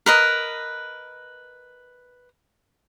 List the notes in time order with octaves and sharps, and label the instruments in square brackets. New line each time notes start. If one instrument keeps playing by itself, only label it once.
[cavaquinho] A#4 B4 D#5